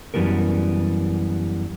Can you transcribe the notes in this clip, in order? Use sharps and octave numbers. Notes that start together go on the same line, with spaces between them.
F#2 C#3 E3 G3 B3 A#4